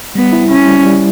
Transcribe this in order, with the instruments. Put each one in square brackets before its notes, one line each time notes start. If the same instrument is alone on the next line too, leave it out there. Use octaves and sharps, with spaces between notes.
[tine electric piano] G3 [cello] B3
[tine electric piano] E4
[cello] C#4 [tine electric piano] E4
[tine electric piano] G3
G3